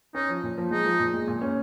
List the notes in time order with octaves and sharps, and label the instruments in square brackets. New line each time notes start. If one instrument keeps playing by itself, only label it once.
[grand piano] C#4 [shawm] D#4
[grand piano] F3
A#2
F3
[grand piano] G#3 [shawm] D#4
[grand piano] F3
A#2
G#3
A#2
C#4